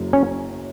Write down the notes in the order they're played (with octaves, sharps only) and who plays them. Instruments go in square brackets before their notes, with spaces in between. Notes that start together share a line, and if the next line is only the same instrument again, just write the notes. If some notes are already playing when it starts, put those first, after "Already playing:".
Already playing: [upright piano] F#1 F#2 F#3
[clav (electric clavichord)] C#4